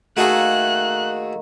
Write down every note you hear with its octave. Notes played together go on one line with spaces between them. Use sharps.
D#3 A3 A#3 F#4 G#4 F#6